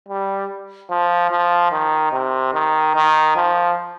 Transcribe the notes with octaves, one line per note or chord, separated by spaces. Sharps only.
G3
F3
F3
D#3
C3
D#3
D#3
F3